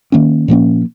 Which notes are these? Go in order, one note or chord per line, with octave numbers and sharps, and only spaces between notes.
D#3 A#3 C#4
A#2 F3 A#3 C#4